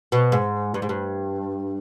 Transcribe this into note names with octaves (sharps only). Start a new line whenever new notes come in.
B2
G#2
G2
G#2
G2